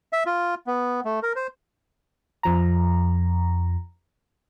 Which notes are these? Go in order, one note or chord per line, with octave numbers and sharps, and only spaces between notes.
E5
F4
B3
A3
A#4
C5
F2 F3 A#5